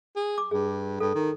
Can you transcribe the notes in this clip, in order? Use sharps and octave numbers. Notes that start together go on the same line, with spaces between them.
G#4
D6
G2 G#4
G2 A4
D#3